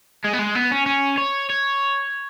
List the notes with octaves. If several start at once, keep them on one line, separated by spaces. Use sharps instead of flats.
G#3
B3
G#3
B3
C#4
C#4
C#5
C#5